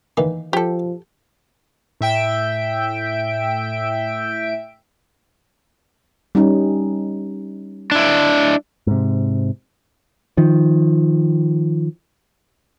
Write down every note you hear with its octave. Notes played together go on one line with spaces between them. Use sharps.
D#3 E3 A#3
F3 G4 A4
A2 E5 G5 D7
G3 C#4 D#4
D4 E4
G#2 C3
D#3 F3